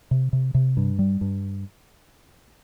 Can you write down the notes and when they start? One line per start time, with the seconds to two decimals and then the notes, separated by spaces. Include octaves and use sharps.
0.11 C3
0.33 C3
0.55 C3
0.77 G2
0.99 G3
1.21 G2